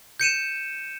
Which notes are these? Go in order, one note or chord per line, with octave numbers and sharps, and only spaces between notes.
G6 C#7 D#7 E7